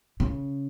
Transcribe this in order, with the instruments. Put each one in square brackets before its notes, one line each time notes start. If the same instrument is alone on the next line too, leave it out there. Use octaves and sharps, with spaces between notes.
[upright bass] C#3